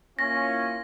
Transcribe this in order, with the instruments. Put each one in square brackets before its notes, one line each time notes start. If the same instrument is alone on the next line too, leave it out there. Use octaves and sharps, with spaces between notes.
[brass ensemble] A#3 E4 F4 [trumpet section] C#4 [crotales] A#6